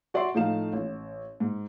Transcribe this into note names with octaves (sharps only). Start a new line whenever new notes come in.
F#4 D5 E5 C6
A2 F3 A3 D#4 F5 E7
A1
G#2